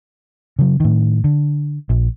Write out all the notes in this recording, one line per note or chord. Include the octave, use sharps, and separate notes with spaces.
C#3 F#3
A2 D#3
D3
A#1